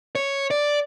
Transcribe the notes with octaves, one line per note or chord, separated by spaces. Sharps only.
C#5
D5